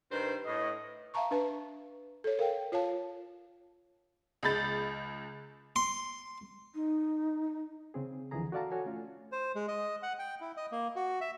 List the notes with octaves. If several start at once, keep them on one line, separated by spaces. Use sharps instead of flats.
G2 D#3 B4 C5
A2 D#5
E5 F5 A5 A#5 C#6
D4 B4 A5
A4 C#5
A#4 F5 G5
F4 C#5 F5 A5
C#2 G#3 B5 G6 A6
C6
D#4
C#3 C4 G#4
C#2 D3 E3 F3 G#4 A#5
F#4 A4 D5 F5 A5 A#5
F#4 A4 C#5 G#5
A3 C#4 F4
C5
G#3
D#5
F#5
G5
E4
D#5
A#3
F#4
E5